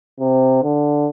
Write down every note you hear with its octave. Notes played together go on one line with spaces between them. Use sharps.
C3
D3